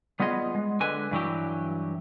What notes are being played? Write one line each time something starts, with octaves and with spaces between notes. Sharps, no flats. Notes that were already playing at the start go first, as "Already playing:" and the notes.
G3 B3 F4 G#4 D#5
G#3
D3 G#3 B4 G#5
G2 E3 F#3 G4